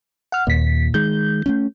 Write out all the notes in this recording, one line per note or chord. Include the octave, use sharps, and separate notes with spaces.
F#5 F6
D#2 A#2 B6
D#3 G#3 G6
A3 A#3 C#4